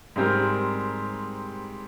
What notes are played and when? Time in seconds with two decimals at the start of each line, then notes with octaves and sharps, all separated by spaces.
0.16 G#2 G3 C4 G4 A#4